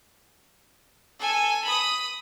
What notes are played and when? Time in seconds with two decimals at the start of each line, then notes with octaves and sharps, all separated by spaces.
1.19 A4 G#5
1.64 B5 D#6